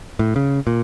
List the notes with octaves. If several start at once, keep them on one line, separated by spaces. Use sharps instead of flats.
A2
C#3
A#2